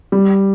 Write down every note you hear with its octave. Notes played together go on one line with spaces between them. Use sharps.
G3